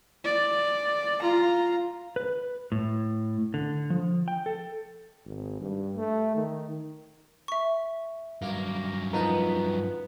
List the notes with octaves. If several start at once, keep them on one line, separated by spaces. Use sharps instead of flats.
D5
F4 A#5
B4
A2
D3
F3
G5
A4
G#1
G2
A3
D#3
E5 C#6
G2 F#3 A#3
F3 B3 D#4 A#4